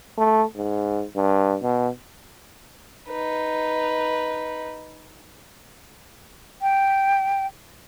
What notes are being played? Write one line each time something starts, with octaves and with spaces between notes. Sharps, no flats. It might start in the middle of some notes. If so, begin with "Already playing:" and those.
A3
G#2
G2
B2
D#4 B4
G5